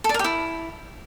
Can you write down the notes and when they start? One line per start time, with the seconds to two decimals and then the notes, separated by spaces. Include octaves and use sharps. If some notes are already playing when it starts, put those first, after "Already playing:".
0.04 A4
0.09 D5
0.14 A#4
0.19 G4
0.24 E4